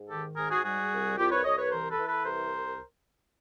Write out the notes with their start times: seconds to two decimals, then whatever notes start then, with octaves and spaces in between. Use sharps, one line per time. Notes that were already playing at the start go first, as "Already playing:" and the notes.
Already playing: G#2
0.09 D#3 G4 A4
0.36 G#2 G#4 A#4
0.51 F#4 G#4
0.64 G3 F#4 G#4
0.91 C2
1.18 C2 F4 G4
1.31 B4 C#5
1.44 C2 C#5 D#5
1.58 B4 C#5
1.72 E3 A#4 C5
1.90 A4 B4
1.99 E3
2.07 A4 B4
2.25 C2 A#4 C5